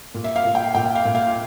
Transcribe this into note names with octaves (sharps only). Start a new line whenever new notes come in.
A#2
E5
F5
A#2
G5
A#2 G5
F5
A#2
F5